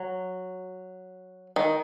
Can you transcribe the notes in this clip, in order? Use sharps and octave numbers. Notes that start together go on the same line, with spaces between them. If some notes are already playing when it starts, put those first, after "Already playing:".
Already playing: F#3
D#3